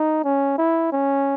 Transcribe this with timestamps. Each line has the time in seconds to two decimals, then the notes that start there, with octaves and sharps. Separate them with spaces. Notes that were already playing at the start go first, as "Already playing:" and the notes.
Already playing: D#4
0.24 C#4
0.58 E4
0.92 C#4